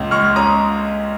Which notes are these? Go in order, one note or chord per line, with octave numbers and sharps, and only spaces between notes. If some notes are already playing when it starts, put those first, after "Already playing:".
Already playing: C#2 A#2 C#4
G#3 C#6 F6
C#4 A#5 D#6